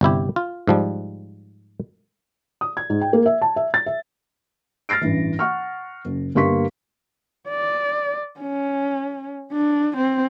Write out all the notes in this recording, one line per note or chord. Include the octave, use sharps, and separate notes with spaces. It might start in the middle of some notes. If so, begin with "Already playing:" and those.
G1 C3 E4 G4
F4
G#2 F3 G3
D#6
G#6
G#2
G5
A#3
E5
A5
E5
A6
E5
F6 A6 A#6 C7 D7
A1 G2 E3
F#5 C#6 F6
F#1
G1 A#3 G4 C6 C#6 B6
D5
C#4
D4
C4